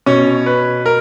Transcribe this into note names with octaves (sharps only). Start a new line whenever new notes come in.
B2 C#4 C#5
B4
A#4